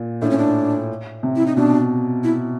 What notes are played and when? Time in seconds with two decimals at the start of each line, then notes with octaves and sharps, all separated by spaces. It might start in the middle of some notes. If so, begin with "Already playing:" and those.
Already playing: A#2
0.22 A2 D4
0.30 C#4
0.38 D4
1.23 C3
1.36 E4
1.46 D#4
1.56 B2 D4
2.24 E4